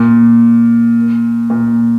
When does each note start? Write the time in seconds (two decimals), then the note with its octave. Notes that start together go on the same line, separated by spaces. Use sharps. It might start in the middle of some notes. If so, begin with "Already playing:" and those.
Already playing: A#2
1.50 A#2